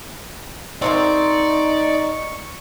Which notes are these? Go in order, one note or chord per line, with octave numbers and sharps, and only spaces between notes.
C3 A#3 C4 D#4 D5 C#6